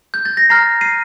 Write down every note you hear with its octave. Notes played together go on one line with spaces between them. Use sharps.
G6
A6
A#6
A#5 F6 A6 C7
C7 D#7